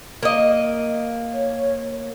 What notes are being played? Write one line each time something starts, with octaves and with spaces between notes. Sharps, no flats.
A#3 D#5
C#5